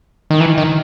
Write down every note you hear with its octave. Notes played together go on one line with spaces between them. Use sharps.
D#3
E3
D#3